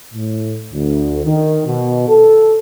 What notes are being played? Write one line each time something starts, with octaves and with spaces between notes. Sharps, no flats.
A2
D2
D#3
B2
A4